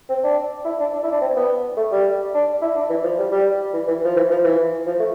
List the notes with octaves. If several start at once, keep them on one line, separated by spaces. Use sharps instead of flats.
C4
D4
E4
D4
D4
E4
D4
C4
B3
A3
G3
D4
E4
D4
E3
F3
G3
G3
E3
E3
F3
E3
F3
E3
F3
A3